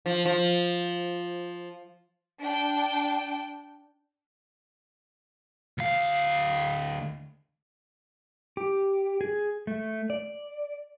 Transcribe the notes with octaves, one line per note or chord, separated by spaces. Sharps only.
F3
F3
D4 G5
D2 F5
G4
G#4
A3
D5